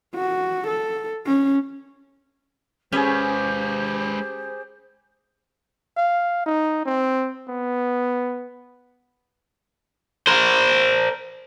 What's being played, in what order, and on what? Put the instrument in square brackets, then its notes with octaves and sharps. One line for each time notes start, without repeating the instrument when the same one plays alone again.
[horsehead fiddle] F#4
A4
C#4
[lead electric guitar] G#3 B4 [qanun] C#4 [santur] G4 G#4 [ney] C5
[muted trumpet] F5
D#4
C4
B3
[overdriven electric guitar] A#4 C5